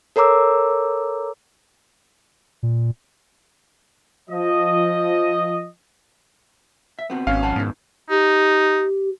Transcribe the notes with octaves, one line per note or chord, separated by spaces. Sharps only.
A4 A#4 C#5 A#5 D6 E6
A#2
F3 D#5
E5
B3 C4 F#4
G#1 C#4 F5
F2 F#5 A5
G#2 B2 D#3
D#4 G4